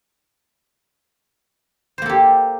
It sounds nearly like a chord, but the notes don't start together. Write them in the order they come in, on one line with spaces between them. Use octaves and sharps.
C5 A#3 A4 G4